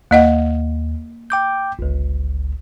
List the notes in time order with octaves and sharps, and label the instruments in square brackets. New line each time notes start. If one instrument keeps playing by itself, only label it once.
[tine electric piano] D#2 [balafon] A#3 D#5 F#5
[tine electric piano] G5 D6 G6
G1 C#2